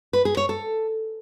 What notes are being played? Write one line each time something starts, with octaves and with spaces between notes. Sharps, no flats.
B4
G#4
C#5
A4